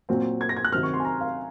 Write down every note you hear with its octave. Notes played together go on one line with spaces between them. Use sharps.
A#2 F#3 C4
G#6
A#6
G#6
F#6
C3 D#3 F#3 C4 F6
C#6
C6
G#5
A#5
F5